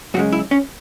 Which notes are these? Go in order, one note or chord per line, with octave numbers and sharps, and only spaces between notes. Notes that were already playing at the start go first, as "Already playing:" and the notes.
F#2 C#3 G#3 F#4
E4
C#4